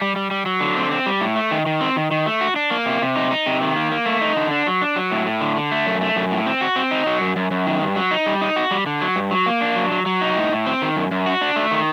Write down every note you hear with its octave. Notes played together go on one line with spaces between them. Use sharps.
G3
G3
G3
F#3
D3
C4
C4
G3
A2
A3
D#3
D#3
C4
D#3
D#3
A3
F#4
D4
A#3
C3
C3
D#4
D#4
C3
D#3
A#3
A#3
A3
D#4
D3
D4
F#3
D4
F#3
A2
A2
D3
D3
A3
F#2
A3
F#2
A2
C4
F#4
C4
D#4
F#3
F#2
F#2
F#2
D#3
G2
F#3
D#4
G3
D#4
F#4
G3
D3
F#3
G2
F#3
A#3
D4
F#3
F#3
F#3
D#4
A2
A2
C4
D#3
F#2
F#2
F#4
D4
A3
D#3